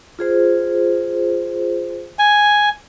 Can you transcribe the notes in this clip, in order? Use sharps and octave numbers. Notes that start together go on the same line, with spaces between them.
F4 G#4 C5
G#5